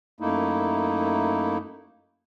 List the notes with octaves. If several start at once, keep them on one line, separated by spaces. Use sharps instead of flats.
F#2 A3 A#3 D#4 E4